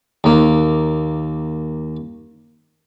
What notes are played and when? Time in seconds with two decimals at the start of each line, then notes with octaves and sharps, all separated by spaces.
0.24 D#2 A#3